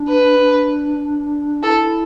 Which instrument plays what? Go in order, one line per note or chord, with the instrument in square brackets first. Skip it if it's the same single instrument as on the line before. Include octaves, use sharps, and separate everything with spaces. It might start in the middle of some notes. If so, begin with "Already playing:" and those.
Already playing: [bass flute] D4
[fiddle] B4
[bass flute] D4
[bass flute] E4 [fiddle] A4